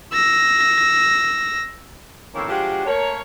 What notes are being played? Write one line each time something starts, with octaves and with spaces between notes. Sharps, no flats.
E6 A#6
F2 A2 D#3 A#3 C#4 A4
F3 G#3 D4 F#4 G4
A3 A#3 A#4 C#5